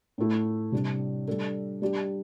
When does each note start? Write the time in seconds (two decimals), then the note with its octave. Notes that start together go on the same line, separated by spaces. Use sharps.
0.18 A2 A3 E4
0.72 C3 G3 D4
1.27 G3 D4 A4
1.82 G3 D4 G4